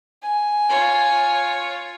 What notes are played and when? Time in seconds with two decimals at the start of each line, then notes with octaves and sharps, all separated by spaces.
0.23 G#5
0.69 F4 C#5